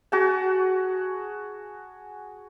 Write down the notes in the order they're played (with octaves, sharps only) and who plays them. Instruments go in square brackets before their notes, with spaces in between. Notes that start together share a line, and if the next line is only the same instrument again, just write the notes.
[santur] F#4 G#4 A5